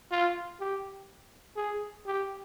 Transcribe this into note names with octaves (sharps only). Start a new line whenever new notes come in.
F4
G4
G#4
G4